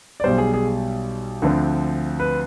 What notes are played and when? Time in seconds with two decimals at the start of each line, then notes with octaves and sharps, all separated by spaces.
0.20 D5
0.24 B1 B2 G3 C5
0.38 G#4
0.54 G#4
1.42 D2 D3 F3 C4
2.20 B4